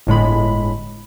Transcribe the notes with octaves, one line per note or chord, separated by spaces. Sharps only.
G1 A2 G#3 B5